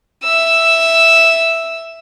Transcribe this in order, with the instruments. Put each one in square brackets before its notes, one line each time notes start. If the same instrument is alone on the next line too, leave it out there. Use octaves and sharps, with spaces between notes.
[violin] E5 E6